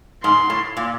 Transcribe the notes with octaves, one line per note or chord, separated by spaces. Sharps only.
G#2 C6
A2
A#2